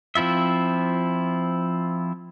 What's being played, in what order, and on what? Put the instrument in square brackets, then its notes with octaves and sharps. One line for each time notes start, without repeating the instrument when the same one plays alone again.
[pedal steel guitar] F3 C4 E4 F4 E5